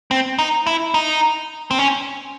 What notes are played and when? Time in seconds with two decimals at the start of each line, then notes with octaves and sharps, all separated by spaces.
0.11 C4
0.39 D#4
0.67 E4
0.94 D#4
1.71 C4
1.78 C#4